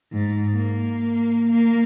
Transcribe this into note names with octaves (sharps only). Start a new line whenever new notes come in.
G#2
A#3
A#3